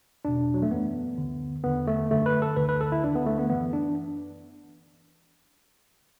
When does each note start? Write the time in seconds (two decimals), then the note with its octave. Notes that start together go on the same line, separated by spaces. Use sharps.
0.25 E2 B2 D4
0.54 F#3
0.62 A3
0.71 F#2 E3 B3
1.18 D2 D3
1.64 E2 D3 B3
1.88 A3
2.11 F#2 D3 A3
2.26 B4
2.42 A4
2.57 D2 D3 B4
2.69 B4
2.81 A4
2.92 E4
3.04 D2 D3 D4
3.15 B3
3.26 A3
3.38 B3
3.49 F#2 E3 B3
3.73 D4